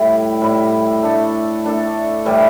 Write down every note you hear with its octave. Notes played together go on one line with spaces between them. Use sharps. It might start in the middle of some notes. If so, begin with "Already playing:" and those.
Already playing: A2 G3 E4
A2 G3 E4
A3 D4 A4
A3 D4 A4
A2 E3 G3